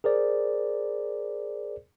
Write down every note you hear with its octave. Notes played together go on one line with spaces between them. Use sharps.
G#4 A#4 C5 D5